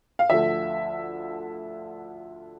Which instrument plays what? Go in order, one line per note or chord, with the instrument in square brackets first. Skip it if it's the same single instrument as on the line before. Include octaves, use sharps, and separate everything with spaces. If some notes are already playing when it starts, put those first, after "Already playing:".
[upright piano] F5
D2 D3 F3 E5